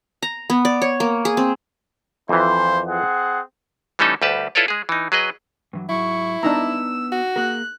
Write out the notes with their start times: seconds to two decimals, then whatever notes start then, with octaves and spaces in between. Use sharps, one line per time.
0.23 A#5
0.50 B3
0.65 D5
0.82 C#5
1.00 A#3
1.25 G#4
1.37 C4
2.29 F2 E3 A#3 E4 C5
2.87 C4 G#4 F#5
3.99 E3 G3 A3 C#4 D#4 A4
4.22 D2 G3 G4 B4 A5
4.55 E4 F4 A4 B4 C#5 D5
4.68 G#3 G#4
4.89 E3 D#4
5.12 F#3 G#4 B4 D#5
5.73 G2 E3 F#3
5.89 G#2 F#3 E4 C#6
6.43 B3 D4 D#4 A#5 E6
7.12 F#4
7.36 A#3 G#4 A#4 F#6